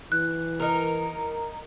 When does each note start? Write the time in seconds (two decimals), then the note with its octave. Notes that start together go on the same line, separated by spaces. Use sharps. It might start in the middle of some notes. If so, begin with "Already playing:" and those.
0.12 E3 F#6
0.60 D#4 A#4